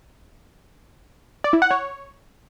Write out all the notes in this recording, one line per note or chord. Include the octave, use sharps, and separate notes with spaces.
D5
E4
F#5
C#5